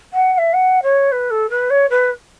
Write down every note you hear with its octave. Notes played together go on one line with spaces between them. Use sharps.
F#5
F#5
E5
F#5
C#5
B4
A4
B4
C#5
B4